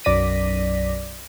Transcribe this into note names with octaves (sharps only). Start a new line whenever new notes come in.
B1 F#2 D5 A#6 B6 D#7